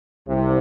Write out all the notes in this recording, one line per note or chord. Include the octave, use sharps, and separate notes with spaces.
C2 C3